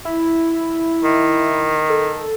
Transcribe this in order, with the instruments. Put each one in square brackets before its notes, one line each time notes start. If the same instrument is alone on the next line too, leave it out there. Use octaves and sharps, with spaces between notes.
[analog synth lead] E4
[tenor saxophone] D#3
[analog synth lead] A4